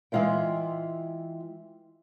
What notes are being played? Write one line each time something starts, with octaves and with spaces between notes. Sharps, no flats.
E3 G#3 F4 E5 G5